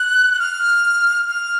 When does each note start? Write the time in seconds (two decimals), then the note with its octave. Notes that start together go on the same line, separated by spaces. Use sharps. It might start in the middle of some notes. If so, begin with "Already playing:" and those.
Already playing: F#6
0.34 F#6
0.39 F6
1.29 F6